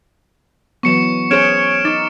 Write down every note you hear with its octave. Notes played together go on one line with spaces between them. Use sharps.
E3 F#3 B3 C#6 C#7 E7
C#4 G#4 C5 C#5 F6 D7 E7
D#4 D6 A6